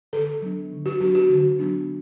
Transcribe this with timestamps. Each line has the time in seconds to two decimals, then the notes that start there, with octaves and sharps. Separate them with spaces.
0.13 D3 A4
0.42 F#3 B3 D4
0.71 D3
0.86 F#4
1.00 F#3 B3 D4 F#4
1.15 F#4
1.30 D3
1.59 F#3 B3 D4